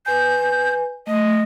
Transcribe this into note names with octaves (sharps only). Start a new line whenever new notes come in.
B4 G#5 G6
A3 D#5